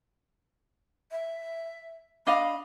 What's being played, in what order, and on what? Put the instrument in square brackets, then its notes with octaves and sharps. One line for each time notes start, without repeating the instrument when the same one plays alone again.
[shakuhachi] E5
[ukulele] D4 D#5 F5 [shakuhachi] B5